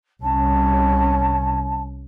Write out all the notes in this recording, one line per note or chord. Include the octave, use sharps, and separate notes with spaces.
C2 C#4 A5